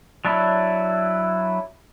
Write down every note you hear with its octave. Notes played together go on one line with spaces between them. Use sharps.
F#3 D4 E4